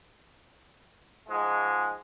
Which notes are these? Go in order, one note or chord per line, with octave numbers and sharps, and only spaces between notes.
G#2 F3 G#3